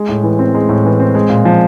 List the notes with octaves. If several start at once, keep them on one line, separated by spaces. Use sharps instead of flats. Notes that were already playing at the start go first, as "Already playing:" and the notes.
Already playing: G#3
A2
E3
C4
G#3
A2
E3
C4
G#3
A#2
F3